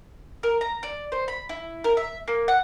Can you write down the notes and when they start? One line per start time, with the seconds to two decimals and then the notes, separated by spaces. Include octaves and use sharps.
0.43 A#4
0.61 A#5
0.83 D5
1.12 C5
1.28 B5
1.49 E4
1.84 A#4
1.97 E5
2.28 A#3
2.48 F#5